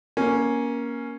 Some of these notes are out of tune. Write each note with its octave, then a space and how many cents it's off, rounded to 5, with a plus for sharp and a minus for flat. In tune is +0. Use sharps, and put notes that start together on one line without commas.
A#3 +15 C#4 +0